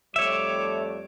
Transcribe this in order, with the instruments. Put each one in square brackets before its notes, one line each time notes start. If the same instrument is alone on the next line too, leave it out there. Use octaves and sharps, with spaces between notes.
[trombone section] F2 G3 A3 [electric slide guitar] C#5 E5 [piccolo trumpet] D6